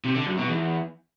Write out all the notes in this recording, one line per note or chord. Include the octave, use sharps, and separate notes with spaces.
C3
D3
F#2
B2
E2